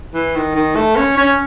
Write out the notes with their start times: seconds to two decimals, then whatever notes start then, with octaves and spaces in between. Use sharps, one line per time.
0.14 E3
0.35 D#3
0.55 D#3
0.76 A3
0.96 C#4
1.17 C#4